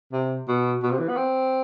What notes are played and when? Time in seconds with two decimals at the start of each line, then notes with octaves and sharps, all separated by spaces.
0.13 C3
0.48 B2
0.83 B2
0.91 C3
0.99 E3
1.09 B3
1.17 C4